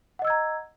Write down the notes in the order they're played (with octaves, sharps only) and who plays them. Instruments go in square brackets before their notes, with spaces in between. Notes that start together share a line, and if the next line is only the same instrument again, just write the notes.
[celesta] F#5
D#5
E6
G#6
A#5